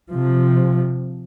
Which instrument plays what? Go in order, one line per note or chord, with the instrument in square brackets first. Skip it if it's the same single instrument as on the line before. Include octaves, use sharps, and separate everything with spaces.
[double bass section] C3 F3